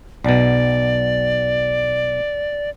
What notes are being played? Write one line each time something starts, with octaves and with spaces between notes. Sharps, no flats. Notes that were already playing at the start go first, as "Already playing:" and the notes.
B1 B2 D5